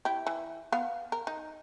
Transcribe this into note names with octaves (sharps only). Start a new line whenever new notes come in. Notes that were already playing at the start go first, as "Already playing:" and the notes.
E4 G4
E3
B3 F5
A#4
D#4